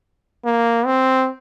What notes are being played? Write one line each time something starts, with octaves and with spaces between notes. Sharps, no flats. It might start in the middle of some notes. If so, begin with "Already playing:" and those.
A#3
C4